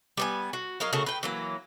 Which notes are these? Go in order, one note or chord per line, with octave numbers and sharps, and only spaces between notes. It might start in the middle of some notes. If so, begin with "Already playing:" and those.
G3 B3 G#5
F#4
F#3 D#4 A#4 F5
C#3 A3 F#4 A#4
B4 G5
E3 F#3 A#3